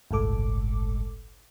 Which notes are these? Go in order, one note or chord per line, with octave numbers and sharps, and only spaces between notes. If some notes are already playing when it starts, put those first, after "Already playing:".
G1 C2 A2 G#3 A4 D6